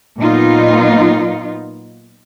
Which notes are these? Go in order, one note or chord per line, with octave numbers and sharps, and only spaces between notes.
A#2 F#3 B3 D#4 F4